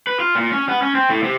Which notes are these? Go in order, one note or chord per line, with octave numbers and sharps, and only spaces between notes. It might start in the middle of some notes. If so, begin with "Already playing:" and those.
B4
F4
A#2
C#4
B3
C#4
C4
A2
C3